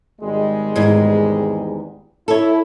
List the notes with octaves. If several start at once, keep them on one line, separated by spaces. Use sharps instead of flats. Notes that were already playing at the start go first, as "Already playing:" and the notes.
G#1 G3 G#3
E2 G#2
E4 A4 C#5